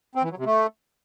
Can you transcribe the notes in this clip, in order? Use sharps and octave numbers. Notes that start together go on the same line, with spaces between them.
C4
E3
F#3
C3
A3